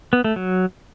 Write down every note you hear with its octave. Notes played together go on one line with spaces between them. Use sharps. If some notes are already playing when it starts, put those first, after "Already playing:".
B3
A3
F#3